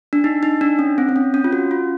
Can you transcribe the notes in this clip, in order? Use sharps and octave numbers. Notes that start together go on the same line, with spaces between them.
D4
D#4
D#4
D4
C#4
C4
C4
C#4
C#4
F4
F#4
F4